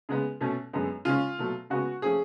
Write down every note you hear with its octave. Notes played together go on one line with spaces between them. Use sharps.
C#3 G#3 B3
B2 A3 C#4
F#2 D3 G#3 B3
C#3 G#3 C#4 F4
B2 F#3 A3
C#3 G#3 B3 F#4
F3 A3 C#4 G#4